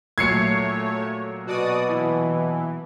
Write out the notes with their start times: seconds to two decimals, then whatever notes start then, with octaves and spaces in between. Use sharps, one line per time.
0.18 A#2 F#3 A3 C#5 G#6 C7 C#7
1.47 B2 F#4 D5 D#6
1.89 E3